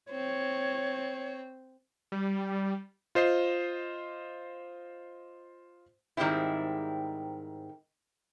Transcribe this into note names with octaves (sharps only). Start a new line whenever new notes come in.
C4 C#5
G3
F4 C5 D#5 C7
G#2 D#3 G3 G#3 C4 E4